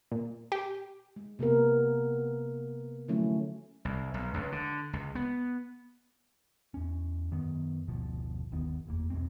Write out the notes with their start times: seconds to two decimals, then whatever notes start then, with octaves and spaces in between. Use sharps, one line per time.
0.12 A#2
0.52 G4
1.16 G#3
1.39 C3 A#3 B3 A#4
3.08 D3 F3 F#3 A3 C#4 E4
3.85 C2
4.14 B1
4.34 C#2
4.52 D3
4.93 C#2
5.15 B3
6.74 E2 C#4
7.31 F#2 D#3 B3
7.88 F#1 D2 B2 F3
8.52 G1 D#2 D#3 B3
8.87 F#1 E2 A#3
9.10 B1 E2 G#3 C4